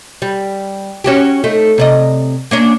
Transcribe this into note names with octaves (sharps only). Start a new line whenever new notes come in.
G3
C#4 F#4 G4
A3 D#4
C3 D5 D#5
A#3 C#4 D4